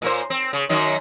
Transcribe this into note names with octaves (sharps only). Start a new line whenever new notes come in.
A#2 A#3 C5
C4
C#3
F#2 D#3 F#3